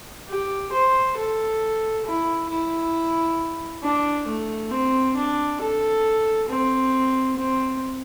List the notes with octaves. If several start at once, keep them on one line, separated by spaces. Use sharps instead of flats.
G4
C5
A4
E4
E4
D4
A3
C4
D4
A4
C4
C4